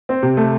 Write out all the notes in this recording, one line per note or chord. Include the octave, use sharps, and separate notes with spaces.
C4
C3
A3